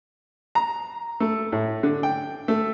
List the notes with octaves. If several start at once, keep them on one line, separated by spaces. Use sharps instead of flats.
A#5
A3
A2
D3
G5
A3